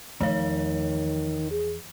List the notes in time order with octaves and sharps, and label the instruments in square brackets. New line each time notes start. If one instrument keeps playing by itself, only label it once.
[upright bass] E2 [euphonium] D#3 [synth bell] F3 C#5
[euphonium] G#4